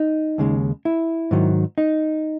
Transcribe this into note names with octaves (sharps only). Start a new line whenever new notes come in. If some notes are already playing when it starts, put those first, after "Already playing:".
Already playing: D#4
D#2 C#3 G#3
E4
G#2 D#3 F#3
D#4